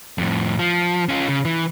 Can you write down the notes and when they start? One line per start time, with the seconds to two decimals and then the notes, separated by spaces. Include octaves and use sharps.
0.18 F2 A2
0.59 F3
1.09 C#4 F4
1.29 C#3
1.45 E3